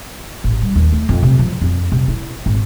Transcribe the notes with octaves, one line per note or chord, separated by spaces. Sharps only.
A1
G3
D#2
A3
F2
C3
F3
F2
C3
E4
G#1